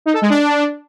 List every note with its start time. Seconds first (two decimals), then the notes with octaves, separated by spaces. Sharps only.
0.06 D#4
0.14 A4
0.22 G#3
0.30 D4